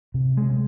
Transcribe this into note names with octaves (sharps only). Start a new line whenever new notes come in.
C3
G#3